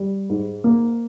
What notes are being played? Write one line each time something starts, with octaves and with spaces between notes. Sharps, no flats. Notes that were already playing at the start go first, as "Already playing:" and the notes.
Already playing: G3
G#2
A#3